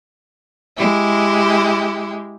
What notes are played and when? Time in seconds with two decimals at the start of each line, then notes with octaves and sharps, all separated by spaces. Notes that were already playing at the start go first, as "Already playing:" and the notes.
0.78 G#3 E4 G4